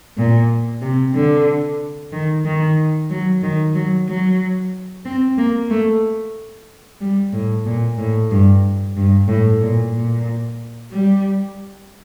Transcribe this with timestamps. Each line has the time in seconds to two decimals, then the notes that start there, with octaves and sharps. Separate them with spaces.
0.17 A#2
0.82 C3
1.14 D3
2.12 D#3
2.45 D#3
3.10 F#3
3.43 D#3
3.75 F#3
4.07 F#3
5.05 C4
5.38 A#3
5.70 A3
7.01 G3
7.33 A2
7.66 A#2
7.98 A2
8.31 G2
8.96 G2
9.28 A2
9.61 A#2
9.94 A#2
10.91 G3